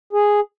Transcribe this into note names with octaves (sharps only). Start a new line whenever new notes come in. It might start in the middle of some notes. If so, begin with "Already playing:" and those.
G#4